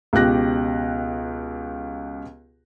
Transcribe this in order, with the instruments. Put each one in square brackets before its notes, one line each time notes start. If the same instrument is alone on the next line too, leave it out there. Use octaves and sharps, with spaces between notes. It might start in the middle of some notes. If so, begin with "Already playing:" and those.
[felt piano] C#2 B2 G4 F#6 A#6